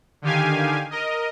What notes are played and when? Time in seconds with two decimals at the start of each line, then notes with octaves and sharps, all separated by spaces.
0.22 D3 D#3 G4 F5 G#5
0.91 A#4 D#5